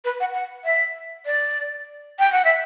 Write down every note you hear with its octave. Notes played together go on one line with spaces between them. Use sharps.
B4
F#5
F#5
E5
D5
G5
F#5
E5